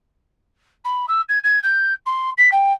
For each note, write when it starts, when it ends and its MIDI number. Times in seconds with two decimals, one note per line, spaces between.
0.84 1.05 83
1.08 1.21 88
1.29 1.38 92
1.43 1.59 92
1.63 1.93 91
2.06 2.30 84
2.37 2.48 95
2.51 2.72 79